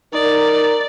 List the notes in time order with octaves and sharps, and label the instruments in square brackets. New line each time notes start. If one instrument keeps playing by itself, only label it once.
[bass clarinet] D#4 [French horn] A#4 [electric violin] D5